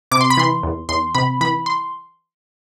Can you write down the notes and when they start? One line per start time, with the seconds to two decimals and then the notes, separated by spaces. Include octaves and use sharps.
0.11 C3 D6
0.21 C6
0.30 B5
0.37 E3 C6
0.63 E2
0.89 E2 C6
1.15 C3 B5
1.41 E3 B5
1.66 C6